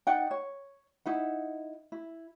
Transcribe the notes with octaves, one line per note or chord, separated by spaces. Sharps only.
D#4 D5 F#5 G5
C#5
D#4 E4 F#5
E4